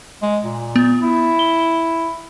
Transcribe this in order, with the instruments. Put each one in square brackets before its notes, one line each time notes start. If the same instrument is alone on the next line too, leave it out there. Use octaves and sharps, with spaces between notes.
[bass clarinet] G#3
A#2
[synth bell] B3
[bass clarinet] E4
[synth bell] G7